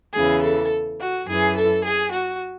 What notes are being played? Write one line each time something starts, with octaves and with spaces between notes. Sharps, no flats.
E2 C#3 E3 G#4
A4
F#4
F#2 E3 G#4
A4
G#4
F#4